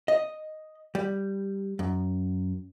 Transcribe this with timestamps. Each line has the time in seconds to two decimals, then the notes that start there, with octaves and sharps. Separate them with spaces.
0.08 D#5
0.95 G3
1.79 F#2